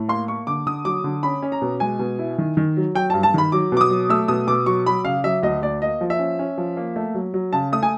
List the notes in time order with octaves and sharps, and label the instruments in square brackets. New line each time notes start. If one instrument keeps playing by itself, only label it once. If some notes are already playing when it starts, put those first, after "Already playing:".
Already playing: [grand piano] A2
A#3 C6
A#3 C#6
D3 D6
D3 D#6
F#3 D6
D3
C#4 B5
C#4
A#5
B2
G#3 G#5
B2
E4
D#3
D#3
F#3
F#3 G5
G2 A5
A5
D#3 B5
F#3 D6
B2 D6
D#6
F#3
A3 E6
B2 D#6
B2 D6
F#3 C#6
F#3 B5
C#3 F5
F#3 E5
D2 D#5
D2 D5
A#3 D#5
F3
E5
C#4
C#4
F3
A#3
A3
F#3
F#3
C#3 A5
A3 D#6
G#5